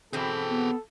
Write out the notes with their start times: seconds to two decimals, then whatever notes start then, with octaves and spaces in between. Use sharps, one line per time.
0.13 E2 B2 C4 G#4 A4 G5
0.49 B3